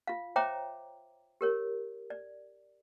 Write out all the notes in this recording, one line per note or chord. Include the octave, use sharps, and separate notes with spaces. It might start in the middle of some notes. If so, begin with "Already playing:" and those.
F4 F5
C5 C#5 E5 G5 A#5 D6
G4 A#4 C#5
D5